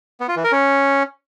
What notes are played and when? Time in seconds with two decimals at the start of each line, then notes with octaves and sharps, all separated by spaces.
0.20 B3
0.28 F4
0.36 E3
0.44 A#4
0.52 C#4